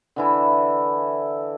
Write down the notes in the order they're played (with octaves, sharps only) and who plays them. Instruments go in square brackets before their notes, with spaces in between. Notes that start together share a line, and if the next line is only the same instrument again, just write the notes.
[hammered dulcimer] D3 E3 E4